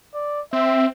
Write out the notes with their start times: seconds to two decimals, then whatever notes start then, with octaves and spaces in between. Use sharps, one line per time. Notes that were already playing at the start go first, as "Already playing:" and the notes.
0.14 D5
0.53 C4 E5